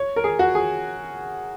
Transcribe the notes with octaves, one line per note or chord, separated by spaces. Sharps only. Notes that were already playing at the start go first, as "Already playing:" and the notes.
Already playing: C#5
A#4
G#4
F#4
G#4